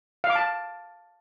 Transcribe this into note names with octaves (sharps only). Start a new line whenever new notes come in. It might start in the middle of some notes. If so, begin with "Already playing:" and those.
F5
D6
A5